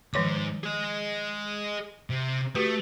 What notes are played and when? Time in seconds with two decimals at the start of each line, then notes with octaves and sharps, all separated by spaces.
0.14 E2 G#2 D#3 F3 D6
0.64 G#4 D#5
2.10 C3
2.55 A3 F#4 G4 B4